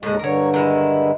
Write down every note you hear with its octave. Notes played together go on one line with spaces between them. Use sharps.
D#2 A2 D3 G#3
G2 D3 A#4 C#5
D#3 G#3 E4